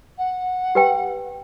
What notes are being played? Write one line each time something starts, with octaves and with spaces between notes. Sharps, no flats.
F#5
G4 B4 G5